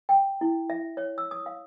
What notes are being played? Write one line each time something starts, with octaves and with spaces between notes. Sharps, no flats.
G5
E4
E5
C#5
E6
D#6
F5